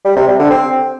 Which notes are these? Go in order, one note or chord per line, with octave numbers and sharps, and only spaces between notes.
G3
C3
G3
D3
C4